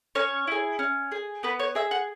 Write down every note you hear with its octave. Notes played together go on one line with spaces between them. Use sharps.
C#4 C#5
E4 G#4
C#4
G#4
B3 B4
C#5
G#4 E5
F#5